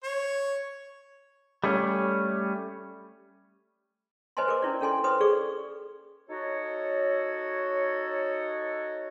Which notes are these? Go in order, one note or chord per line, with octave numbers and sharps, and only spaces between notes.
C#5
G3 A3 C#4
B4 C5 D#5 G#5 A5 C6
A#4 D6
C#4 E4 D5
C#4 A4 G#5 C6
B4 C5 C6 D#6
G#4 A4 D5 C#6
D#4 F#4 A4 C#5